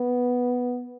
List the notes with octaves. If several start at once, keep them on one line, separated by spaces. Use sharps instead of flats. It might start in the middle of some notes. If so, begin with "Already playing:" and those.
Already playing: B3